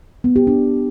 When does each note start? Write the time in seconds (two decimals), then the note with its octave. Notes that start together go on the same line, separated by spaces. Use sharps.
0.24 B3
0.36 G4
0.47 D4